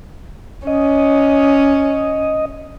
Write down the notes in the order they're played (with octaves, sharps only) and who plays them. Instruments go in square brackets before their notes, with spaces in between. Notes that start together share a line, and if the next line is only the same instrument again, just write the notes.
[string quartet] C#4 [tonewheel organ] D#5